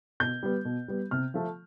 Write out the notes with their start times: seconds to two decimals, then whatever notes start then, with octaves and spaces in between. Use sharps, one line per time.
0.20 B2 G6
0.43 G3 B3
0.65 B2
0.88 G3 B3
1.11 C3 F6
1.34 F3 A3